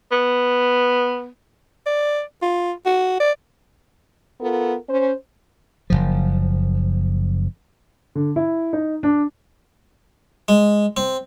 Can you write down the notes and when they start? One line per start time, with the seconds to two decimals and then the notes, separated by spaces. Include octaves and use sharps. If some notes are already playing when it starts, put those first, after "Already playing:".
0.12 B3
1.86 D5
2.42 F4
2.86 F#4
3.20 D5
4.39 B3 F4 A4 A#4
4.88 C#4 C5
5.90 F#1 C2 F3
8.15 D3
8.36 E4
8.73 D#4
9.03 D4
10.48 G#3
10.97 C4